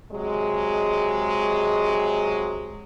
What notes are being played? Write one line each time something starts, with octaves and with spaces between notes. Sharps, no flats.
C3 F#3 G#3